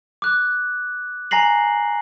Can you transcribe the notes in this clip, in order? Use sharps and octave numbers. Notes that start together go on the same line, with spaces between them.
D6 F#6
G#5 A#5 A#6 C7 F#7